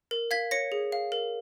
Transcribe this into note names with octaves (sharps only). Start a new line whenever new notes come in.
A#4
F5 G#6 B6
C#5 A#6 C#7
G#4
F5
A#4